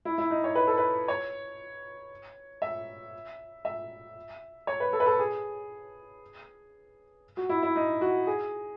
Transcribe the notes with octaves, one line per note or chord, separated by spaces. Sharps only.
E4
E4
D#4
C#5
B4
A4
B4
C#5
E5
E5
C#5
B4
A4
B4
A4
G#4
F#4
E4
E4
D#4
F#4
G#4